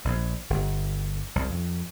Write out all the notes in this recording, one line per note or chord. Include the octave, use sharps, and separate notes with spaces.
A#1
G1
C2
F2